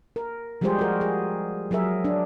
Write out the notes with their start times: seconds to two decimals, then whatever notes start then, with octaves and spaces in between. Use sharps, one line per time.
0.16 A#4
0.61 F3 G3 G#3 G4 G#4 C5
0.78 F#4 A#4
1.01 G#4
1.71 F#3 G#4 A#4 E5
2.05 D4